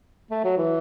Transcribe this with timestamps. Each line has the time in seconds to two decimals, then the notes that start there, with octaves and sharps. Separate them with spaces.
0.31 A3
0.44 F#3
0.58 E3